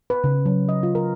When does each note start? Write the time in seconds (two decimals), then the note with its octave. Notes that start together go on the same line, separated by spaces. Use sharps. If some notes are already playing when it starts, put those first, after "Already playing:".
0.10 B4
0.24 C#3
0.46 F#3
0.69 D#5
0.83 F4
0.95 A#4